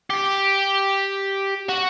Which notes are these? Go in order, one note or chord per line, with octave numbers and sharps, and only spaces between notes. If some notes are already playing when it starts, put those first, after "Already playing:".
G4
F#4